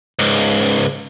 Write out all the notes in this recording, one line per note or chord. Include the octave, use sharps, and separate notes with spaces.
C#2 G#2